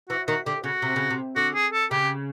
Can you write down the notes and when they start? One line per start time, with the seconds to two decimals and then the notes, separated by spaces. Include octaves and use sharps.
0.09 E3 F#4
0.27 D#3 F#4
0.46 D3 G4
0.64 C#3 F#4
0.82 C3
0.96 C#3
1.10 C3
1.36 D3 F#4
1.55 G#4
1.73 A4
1.91 C#3 G4